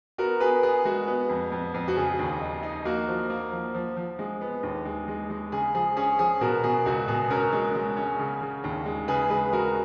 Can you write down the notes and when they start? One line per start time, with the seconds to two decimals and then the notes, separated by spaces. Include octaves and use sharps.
0.18 B3 F#4 A#4
0.40 B3 G#4 B4
0.63 B3 G#4
0.85 G#3 F#4
1.07 B3
1.29 F2
1.52 F2
1.74 F2
1.88 F#4
1.96 C#3 G#4
2.19 D#2
2.41 D#4
2.63 D#4
2.85 A#3 F#4
3.08 F3
3.30 A#3
3.52 F3
3.75 F3
3.97 F3
4.19 G#3
4.41 B3
4.63 D#2
4.85 G#3
5.08 G#3
5.30 G#3
5.52 C#3 G#4
5.74 F3 G#4
5.97 C#4 G#4
6.19 F3 G#4
6.41 B2 F#4 A#4
6.64 B2 G#4
6.86 C#2 F#4
7.08 B2 G#4
7.30 C#4 F#4 A#4
7.53 G#3
7.75 G#3
7.97 C#4
8.19 C#3
8.41 C#3
8.64 D#2
8.86 G#3
9.08 C#3 G#4 B4
9.30 G#3 G#4 B4
9.53 G#3 F#4 A#4